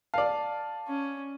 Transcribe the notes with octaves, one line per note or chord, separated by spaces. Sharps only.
D5 F5 A5
C#4